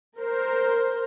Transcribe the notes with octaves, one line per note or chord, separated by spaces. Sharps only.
A#4 C5